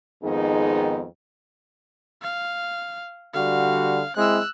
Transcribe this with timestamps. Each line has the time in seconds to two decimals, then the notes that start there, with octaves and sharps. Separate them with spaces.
0.23 F2 G#2 D#3 B3 D#4 G#4
2.22 F5
3.34 D3 G3 F#4 F5
4.16 G#3 C4 E4 E6 F#6